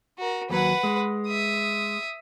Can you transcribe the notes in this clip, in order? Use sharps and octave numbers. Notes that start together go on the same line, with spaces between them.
F#4 A#4
D#2 F#3 B4 F#5
G#3
E5 D#6